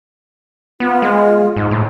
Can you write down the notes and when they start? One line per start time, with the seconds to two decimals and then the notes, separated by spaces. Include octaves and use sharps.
0.80 B3 F4
1.02 G#3
1.56 G#2
1.71 A2